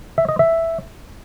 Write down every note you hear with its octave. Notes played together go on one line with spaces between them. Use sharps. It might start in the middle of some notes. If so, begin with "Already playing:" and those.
E5
D#5
E5